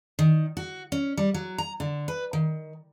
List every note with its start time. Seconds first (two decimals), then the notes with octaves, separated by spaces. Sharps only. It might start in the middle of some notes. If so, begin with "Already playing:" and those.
0.19 D#3
0.57 F#4
0.92 C#4
1.17 G3
1.34 F#3
1.58 A#5
1.80 D3
2.08 B4
2.33 D#3